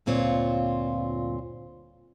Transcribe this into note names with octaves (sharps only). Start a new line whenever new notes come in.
D2 G2 A#2 C4 F4 C#5